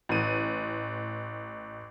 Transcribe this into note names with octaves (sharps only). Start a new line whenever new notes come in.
A1 D#7